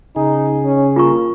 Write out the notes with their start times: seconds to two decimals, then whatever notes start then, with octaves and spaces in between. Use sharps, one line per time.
0.16 C#3 D#4 G#4
0.65 C#4
0.96 A#3 F4 A#5 C#6